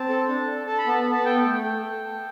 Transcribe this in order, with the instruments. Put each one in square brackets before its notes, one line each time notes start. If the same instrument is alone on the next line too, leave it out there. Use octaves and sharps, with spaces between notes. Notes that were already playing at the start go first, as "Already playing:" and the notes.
Already playing: [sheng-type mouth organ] C4 A5
A4
D4
A4
A4 A5
B5
B3 A5
B5
B3
A5
A4 G5
A3
A4
A4
A4